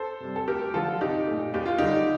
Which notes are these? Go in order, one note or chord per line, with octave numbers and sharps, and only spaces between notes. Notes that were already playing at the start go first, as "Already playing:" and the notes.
Already playing: A4 C5
C3 G3
A4
D2 G4 A#4
D3 F3 F4 A4
C2 D#4 G4
A#2 A3
D#2 G4
F4
D3 G3 D#4 G4